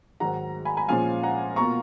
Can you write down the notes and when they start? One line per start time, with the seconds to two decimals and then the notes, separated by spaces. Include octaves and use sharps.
0.20 G#2 D#3 F#3 F#5 A#5
0.65 G#5 B5
0.77 G#5 B5
0.89 A#2 F3 G#3 C#4 F4 F5 G#5
1.23 F#5 A#5
1.56 B2 A#3 F4 A#5 C#6